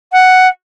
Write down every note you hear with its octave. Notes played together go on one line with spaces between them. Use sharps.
F#5